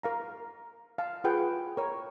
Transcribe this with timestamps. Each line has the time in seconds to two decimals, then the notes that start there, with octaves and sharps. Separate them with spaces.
0.03 A#4 F5 A#5
0.98 F5 A5
1.24 F4 G#4 B4 F#5 G5
1.77 A#4 C#5